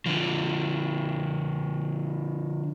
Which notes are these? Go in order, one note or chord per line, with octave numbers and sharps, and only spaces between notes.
D3 F3